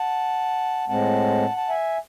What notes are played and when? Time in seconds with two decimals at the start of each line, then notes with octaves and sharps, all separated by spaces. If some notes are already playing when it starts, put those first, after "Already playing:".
Already playing: F#5 A5
0.89 A2 G#3 C4 F#5 A5
1.57 A5
1.69 E5 G#5